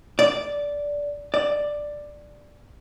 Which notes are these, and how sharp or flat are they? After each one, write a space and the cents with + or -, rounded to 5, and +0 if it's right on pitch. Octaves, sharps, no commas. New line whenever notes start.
D5 -10
D5 +5